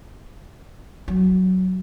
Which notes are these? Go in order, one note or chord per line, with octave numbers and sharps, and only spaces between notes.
F#3